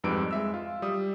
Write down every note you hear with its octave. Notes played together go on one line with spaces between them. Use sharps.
F2 G#2 G3 B4 E6 D7
G#3 E5 E6
F4
G3 D#6